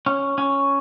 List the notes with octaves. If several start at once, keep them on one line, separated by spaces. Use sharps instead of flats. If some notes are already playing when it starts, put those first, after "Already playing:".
C#4
C#4